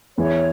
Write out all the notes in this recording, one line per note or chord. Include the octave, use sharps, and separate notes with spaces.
E2 E3 C#5